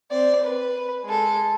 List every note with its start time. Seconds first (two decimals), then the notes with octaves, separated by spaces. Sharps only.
0.11 C4 D5
0.43 B4
1.05 G#3 A4